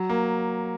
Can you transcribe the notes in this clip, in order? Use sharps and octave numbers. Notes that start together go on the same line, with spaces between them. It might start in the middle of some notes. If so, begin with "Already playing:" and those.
Already playing: F#3
A#3